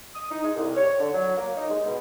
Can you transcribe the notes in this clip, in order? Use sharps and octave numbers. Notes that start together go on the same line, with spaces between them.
D#6
D#4
G#3
C2
C#5
D3
F#3
A#3
D#4
G#3
B2